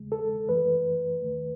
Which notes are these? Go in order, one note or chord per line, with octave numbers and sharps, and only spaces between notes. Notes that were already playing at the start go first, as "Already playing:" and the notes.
Already playing: E2 C#3 G#3
A4
F#2 E3 A3 B4
D#2 D#3 A3